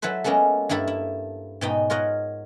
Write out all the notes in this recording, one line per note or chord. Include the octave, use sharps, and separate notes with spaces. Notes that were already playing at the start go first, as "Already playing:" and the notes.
F#3 E4 A4 B4 C5
G#3 A#3 B3 C#4 A4
G2 A#3 E4 A4 B5
E4
G#2 B2 D#4 G5
F4 A#4 C#5 D#5 F#5